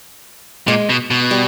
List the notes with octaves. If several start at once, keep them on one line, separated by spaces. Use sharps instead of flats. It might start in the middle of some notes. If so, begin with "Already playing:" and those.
A#2 G#3
B2
B2
G3